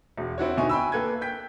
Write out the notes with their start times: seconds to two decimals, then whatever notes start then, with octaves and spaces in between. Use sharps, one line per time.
0.18 E1
0.38 C4 E4 F#4 C#5
0.57 B2 D3 D#4 E5 G#5 C#6
0.69 G5 G#5 B5 E6
0.92 A#3 A4 B4 G#6
1.21 G5 G6 B6